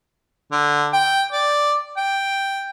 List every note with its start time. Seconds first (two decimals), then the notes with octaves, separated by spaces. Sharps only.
0.52 D3
0.93 G5
1.32 D5
1.97 G5